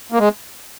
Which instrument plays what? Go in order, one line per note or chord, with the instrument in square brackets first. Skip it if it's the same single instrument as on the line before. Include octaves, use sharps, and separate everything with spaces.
[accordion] A#3
G#3